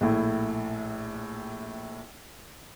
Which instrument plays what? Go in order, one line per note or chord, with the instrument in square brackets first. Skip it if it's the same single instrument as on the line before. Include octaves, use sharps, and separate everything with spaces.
[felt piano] A#1 A2 E4